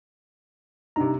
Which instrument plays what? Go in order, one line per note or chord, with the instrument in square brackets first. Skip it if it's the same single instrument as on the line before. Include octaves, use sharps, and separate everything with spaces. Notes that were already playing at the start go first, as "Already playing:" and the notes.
[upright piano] G2 C3 [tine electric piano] D4 D#4 A#5